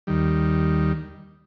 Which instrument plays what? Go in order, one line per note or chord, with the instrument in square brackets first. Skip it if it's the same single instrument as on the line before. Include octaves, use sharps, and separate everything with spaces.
[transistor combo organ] D#2 D#3 G3